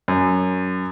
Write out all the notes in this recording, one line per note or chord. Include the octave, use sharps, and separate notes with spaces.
F#2